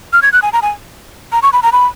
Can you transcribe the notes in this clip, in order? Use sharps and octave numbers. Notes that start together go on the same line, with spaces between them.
F6
G#6
F#6
G#5
A#5
G#5
A#5
C#6
B5
A#5
B5